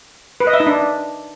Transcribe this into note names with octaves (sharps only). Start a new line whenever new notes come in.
B4
D#5
E5
D#4
D4